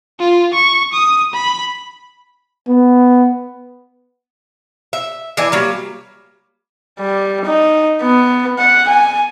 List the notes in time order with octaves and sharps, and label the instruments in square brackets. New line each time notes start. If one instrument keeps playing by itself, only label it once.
[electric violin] F4
C#6
D#6
B5
[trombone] B3
[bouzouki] E5
E3 D4 E4 G#5
F#3 G3 A#3
[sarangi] G3
D#4
B3
F#5
G#5